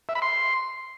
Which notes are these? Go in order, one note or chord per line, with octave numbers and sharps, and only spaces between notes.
E5
B5
C6